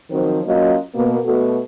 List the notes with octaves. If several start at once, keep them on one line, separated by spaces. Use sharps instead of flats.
D#3 F3 F#3 C4 C5
F#3 A#3 C#4 F4 D#5
B2 A#3
B2 A3 F#4 A4